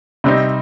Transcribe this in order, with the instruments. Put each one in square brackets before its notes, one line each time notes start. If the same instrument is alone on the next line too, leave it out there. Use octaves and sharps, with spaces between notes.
[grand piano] C3 G3 C4 D#4